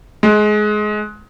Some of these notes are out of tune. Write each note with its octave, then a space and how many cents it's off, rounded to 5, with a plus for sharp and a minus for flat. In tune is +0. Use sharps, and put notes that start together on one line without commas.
G#3 +20